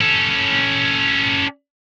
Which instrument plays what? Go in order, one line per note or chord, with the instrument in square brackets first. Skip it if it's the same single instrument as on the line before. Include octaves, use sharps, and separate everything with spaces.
[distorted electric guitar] C#4 A4